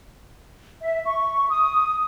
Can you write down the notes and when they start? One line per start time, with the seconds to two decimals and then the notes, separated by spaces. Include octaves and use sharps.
0.81 E5
1.05 C#6
1.49 D#6